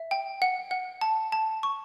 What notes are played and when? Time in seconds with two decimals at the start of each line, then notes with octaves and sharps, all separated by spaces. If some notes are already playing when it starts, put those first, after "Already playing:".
Already playing: E5
0.11 G5
0.42 F#5
0.71 F#5
1.01 A5
1.32 A5
1.63 C#6